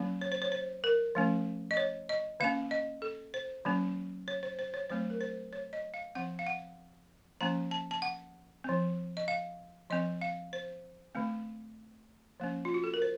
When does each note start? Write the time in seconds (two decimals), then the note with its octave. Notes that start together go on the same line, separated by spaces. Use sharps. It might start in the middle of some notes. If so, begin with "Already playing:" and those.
Already playing: D#3 F#3 A#3 C#4
0.21 C#5
0.32 C5
0.42 C#5
0.52 C5
0.84 A#4
1.15 F3 A3 C#4
1.71 D#5
1.77 C#5
2.09 D#5
2.40 D#3 A#3 C#4 F5
2.71 D#5
3.02 A4
3.34 C5
3.65 D#3 F#3 A#3 C#4
4.28 C#5
4.43 C5
4.59 C5
4.74 C#5
4.90 D#3 F#3 A3 C4 C5
5.10 A#4
5.21 C5
5.53 C#5
5.73 D#5
5.94 F5
6.15 F3 C4 F#5
6.39 F5
6.47 F#5
7.41 F3 A#3 C#4 A#5
7.71 A5
7.91 A5
8.02 F#5
8.64 F3 C4
9.17 D#5
9.28 F5
9.90 F3 C4 D#5
10.21 F5
10.53 C5
11.15 D#3 A3 C4
12.40 F3 A#3 C#4
12.65 F4
12.74 F#4
12.84 A4
12.94 A#4
13.02 C5